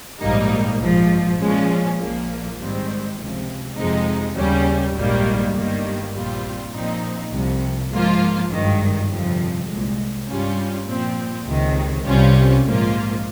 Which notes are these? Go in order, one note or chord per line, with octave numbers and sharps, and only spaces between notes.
A#1 G#2 G3 A#3 D#4
A#1 G#2 F3
A#2 F3 G#3 C#4
A#1 A#2 F3 A#3
G#2 D#3 G3 C4
C#2 C3 F3
F2 C3 F3 G#3 D#4
D#2 C#3 G3 C#4
A#1 G#2 D#3 G3 A#3
G1 G2 D#3 G3 A#3
A#1 A#2 G3 C4 F4
A#1 A#2 F3 C4 D#4
C2 C3 F3
G#2 F3 A#3 F4
G#1 G2 D#3
G1 F2 C3 F3
C2 A#2 G#3
G2 G3 C#4 F4
A#2 F3 C4
C#2 C3 D#3
C2 C3 G3 C#4 F4
A#1 G#2 F3 A#3 F4